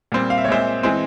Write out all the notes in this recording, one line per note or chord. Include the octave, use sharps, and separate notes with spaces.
A#2 G3 C4
F5
E5
C#5
A#2 G#3 C4 C5 E5
E3 G#3 C4